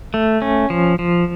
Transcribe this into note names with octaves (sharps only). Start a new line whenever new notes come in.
A3
C#4
F3
F3